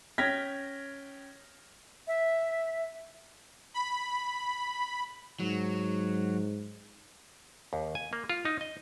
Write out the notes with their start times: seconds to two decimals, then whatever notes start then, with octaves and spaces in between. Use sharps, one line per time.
0.18 C#4 G5 F6 G#6 A#6 B6
2.08 E5
3.74 B5
5.40 G#2 F#3
7.73 D#2
7.95 G#5
8.13 A#3
8.30 F4
8.45 D#4
8.61 D#5